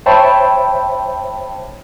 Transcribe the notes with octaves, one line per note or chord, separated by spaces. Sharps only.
C5 C#5 E5 G5 A5 B5